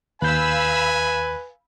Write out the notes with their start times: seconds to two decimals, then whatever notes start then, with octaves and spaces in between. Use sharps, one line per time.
0.22 D#2 B4 F5 G#5 B5 E6 G6